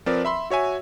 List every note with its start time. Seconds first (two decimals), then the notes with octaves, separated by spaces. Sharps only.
0.06 F3 C4 A#4 B4 D5
0.25 E5 B5 C6 E6
0.50 F#4 C#5 E5 G#5